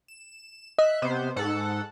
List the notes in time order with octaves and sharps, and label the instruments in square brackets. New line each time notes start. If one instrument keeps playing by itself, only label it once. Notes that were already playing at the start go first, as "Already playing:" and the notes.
[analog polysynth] E7
[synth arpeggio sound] D#5 [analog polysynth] E5 F#6
[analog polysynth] C3 B3 C5
G#2 A4 F#5